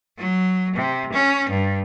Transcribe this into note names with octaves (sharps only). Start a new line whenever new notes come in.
F#3
C3
C#4
G2